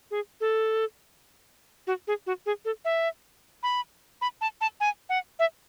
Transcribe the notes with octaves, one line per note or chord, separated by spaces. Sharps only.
G#4
A4
F#4
G#4
F#4
G#4
A4
E5
B5
B5
A5
A5
G#5
F#5
E5